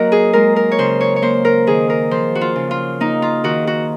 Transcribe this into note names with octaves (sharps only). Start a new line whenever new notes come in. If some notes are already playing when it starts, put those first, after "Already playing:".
Already playing: F#3 A#3 F#4 A#4 D#5
G#4
G#3 A#4
A#4
C#5
C#3 C5
C#5
C#5
A#3 C5
A#4
D#3 G#4
A#4
F3 C5
F#4
F4
C#3
F4
A#3 D#4
F4
D#3 F#4
F#4